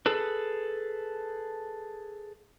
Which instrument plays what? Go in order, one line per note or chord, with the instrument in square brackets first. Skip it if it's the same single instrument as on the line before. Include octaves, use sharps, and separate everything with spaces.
[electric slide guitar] G#4 A4 B4